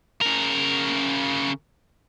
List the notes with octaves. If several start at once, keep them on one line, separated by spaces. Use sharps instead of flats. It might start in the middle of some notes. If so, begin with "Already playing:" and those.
C#3 A#4